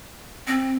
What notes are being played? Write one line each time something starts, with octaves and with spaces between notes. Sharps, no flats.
C4